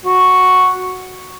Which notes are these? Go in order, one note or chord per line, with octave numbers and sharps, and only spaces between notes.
F#4